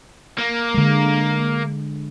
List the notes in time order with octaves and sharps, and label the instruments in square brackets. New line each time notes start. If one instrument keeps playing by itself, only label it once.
[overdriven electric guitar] A#3
[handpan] D3 G#3